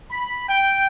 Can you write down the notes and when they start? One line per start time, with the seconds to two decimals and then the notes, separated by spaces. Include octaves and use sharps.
0.10 B5
0.48 G5